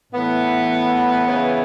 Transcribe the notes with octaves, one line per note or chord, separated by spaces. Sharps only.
A2 E3 B3
C#3 E3